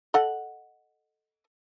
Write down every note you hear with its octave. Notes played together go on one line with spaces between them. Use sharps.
A4 D#5 F#5